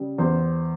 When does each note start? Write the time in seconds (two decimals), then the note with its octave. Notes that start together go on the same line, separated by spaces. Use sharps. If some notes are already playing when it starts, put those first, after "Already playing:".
Already playing: C#3 G3
0.18 E2 C5